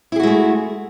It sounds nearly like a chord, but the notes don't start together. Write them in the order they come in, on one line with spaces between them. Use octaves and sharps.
E4 G#4 F#4 G#3 A3